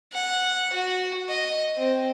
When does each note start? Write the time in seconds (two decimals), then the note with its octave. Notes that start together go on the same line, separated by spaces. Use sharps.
0.13 F#5
0.73 F#4
1.29 D#5
1.77 C4